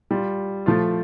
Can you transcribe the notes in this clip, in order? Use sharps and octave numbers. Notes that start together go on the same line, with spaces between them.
G3 F4
F3 A3 F4